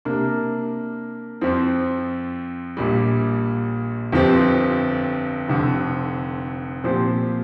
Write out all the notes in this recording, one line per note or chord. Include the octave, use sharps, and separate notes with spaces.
C3 A#3 D4 A#4
F2 F3 C4
A#1 A#2 G3
G1 F2 F3 C4 G4
F1 F2 D3
A#2 F3 C4 G4 C5